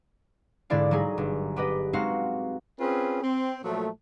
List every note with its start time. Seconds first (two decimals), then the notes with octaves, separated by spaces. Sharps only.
0.70 G#2 D3 G#3 E4 D5 F5
0.91 F#3 G3 D#4 G#4
1.18 G1
1.56 B3 G4 B4 D#5
1.93 G#3 C4 D#4 F#4 F5 F#5
2.80 C4 C#4 F4 G#4 B4
3.22 C4
3.63 A#2 F3 F#3 A3